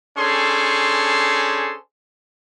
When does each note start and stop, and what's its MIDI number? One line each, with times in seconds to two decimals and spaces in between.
0.17 1.76 61
0.17 1.76 62
0.17 1.76 68
0.17 1.76 69
0.17 1.76 72
0.17 1.76 84